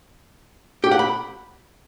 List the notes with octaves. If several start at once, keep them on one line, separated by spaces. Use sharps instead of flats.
G4
F#5
B5